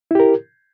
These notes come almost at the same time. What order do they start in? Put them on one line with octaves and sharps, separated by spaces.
E4 G4 A#4